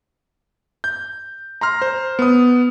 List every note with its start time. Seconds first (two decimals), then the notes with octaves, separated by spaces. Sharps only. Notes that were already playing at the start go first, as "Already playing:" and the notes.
0.84 G6
1.61 A#5 C6 F6
1.82 C5
2.19 B3 D#6